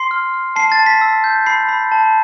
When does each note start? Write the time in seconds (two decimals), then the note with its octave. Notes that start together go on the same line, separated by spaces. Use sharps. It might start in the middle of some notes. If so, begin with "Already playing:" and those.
Already playing: C6 C7
0.11 F6
0.34 F6
0.56 A5 C7
0.72 A6
0.79 A5
0.86 B6
1.01 E6
1.24 G6
1.46 B5 C7
1.69 B5
1.92 A5